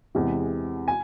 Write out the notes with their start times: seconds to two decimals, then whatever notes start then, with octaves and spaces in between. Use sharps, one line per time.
0.15 E2 C3 E3 G#3
0.88 G#5